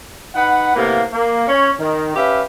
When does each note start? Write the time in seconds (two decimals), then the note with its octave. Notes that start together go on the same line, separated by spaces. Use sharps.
0.34 D#4 B4 F#5
0.75 A2 C3 A#3 B3 F5
1.12 A#3
1.47 C#4 C#5
1.79 D#3
2.15 C#4 G4 B4 E5 F5